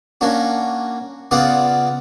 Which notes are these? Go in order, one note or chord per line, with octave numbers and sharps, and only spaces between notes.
A#3 C#4 D4 F#4
C#3 B3 F4 D5 F#5